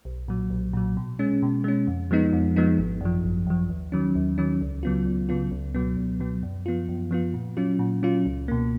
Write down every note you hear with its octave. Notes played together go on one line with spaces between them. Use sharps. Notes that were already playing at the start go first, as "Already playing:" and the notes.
B1
A#2 F#3
B1
A#2 F#3
B2
G#3 C#4
B2
G#3 C#4
F2
F3 G#3 B3 D#4
F2
F3 G#3 B3 D#4
G#1
F#2 F3
G#1
F#2 F3
D#2
D#3 F#3 C#4
D#2
D#3 F#3 C#4
C#2
C#3 F#3 B3 F4
C#2
C#3 F#3 B3 F4
C#2
B2 F#3 B3
C#2
B2 F#3 B3
F#2
F3 B3 F4
F#2
F3 B3 F4
A#2
F#3 C#4 F4
A#2
F#3 C#4 F4
C#2
B2 A#3